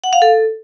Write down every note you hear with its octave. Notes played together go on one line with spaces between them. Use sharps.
F#5
F5
A4